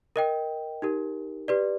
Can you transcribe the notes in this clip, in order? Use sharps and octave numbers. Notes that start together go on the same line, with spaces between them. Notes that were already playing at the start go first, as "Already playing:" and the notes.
A#4 D#5 G5
D#4 G4 A#4
G4 B4 D5